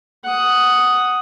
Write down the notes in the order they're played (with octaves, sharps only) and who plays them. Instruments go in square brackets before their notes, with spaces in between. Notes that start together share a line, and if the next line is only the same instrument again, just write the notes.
[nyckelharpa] F#5 D#6